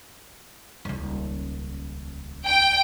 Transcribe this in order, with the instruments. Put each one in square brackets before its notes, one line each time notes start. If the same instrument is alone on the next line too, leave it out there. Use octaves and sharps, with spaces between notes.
[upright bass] D#1 C#2
[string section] G5